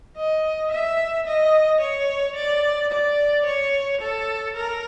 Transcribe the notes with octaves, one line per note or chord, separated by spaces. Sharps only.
D#5
E5
D#5
C#5
D5
D5
C#5
A4
A#4